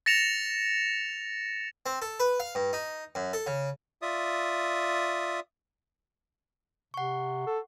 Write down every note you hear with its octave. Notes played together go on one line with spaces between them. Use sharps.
A6 A#6 C#7 E7 F7
C4
A4
B4
F5
G2
D#4
F#2
A4
C#3
F4 D5 E5 D#6
C3 F#5 C#6
A4